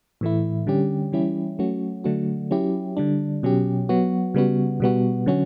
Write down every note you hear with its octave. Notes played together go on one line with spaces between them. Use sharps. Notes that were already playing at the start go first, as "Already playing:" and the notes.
A2 E3 A3 E4
D3 G3 C#4 G4
E3 G3 C#4 E4 G4
F#3 A3 C#4 F#4
D3 F#3 A3 D4 F#4
F#3 C#4 E4 G4
D3 G3 D4
B2 F#3 C#4 G4
F#3 B3 F#4
C#3 G3 B3 F#4
B2 G3 B3 F#4
D3 F#3 C#4 F#4